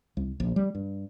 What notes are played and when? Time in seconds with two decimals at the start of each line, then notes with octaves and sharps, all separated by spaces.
0.17 C2
0.40 A#1
0.56 G3
0.75 G2